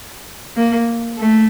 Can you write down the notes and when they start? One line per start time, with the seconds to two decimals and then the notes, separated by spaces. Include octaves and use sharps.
0.57 A#3
1.18 A3